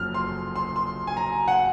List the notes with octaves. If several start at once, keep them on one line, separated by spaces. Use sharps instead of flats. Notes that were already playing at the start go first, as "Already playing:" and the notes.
Already playing: F#1 F#2 C#3 F3 F6
C6
C6
C6
G#5
A#5
F#5